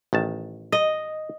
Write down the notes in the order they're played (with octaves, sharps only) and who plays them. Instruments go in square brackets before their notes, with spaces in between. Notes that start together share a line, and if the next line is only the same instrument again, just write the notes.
[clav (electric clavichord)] A1 D#3 A5
[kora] D#5